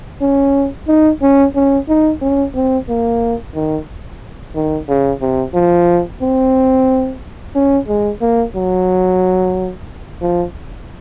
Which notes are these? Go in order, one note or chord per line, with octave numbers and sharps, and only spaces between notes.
C#4
D#4
C#4
C#4
D#4
C#4
C4
A#3
D#3
D#3
C#3
C3
F3
C4
C#4
G#3
A#3
F#3
F3